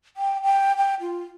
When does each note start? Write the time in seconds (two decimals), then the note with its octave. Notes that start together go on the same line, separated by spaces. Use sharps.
0.17 G5
0.43 G5
0.77 G5
1.01 F4